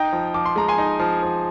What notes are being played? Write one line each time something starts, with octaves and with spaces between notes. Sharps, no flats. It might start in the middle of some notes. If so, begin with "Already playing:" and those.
Already playing: D#4 G5 A#5
F3
F3 D6
C6
G#3 A#5
G#5 C6
D#4
F3
F3